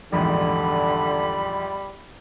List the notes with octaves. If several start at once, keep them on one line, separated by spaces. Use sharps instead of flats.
A#1 E2 G#2 D3 G3 B5